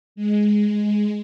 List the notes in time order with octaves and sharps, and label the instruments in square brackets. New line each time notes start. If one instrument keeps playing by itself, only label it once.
[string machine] G#3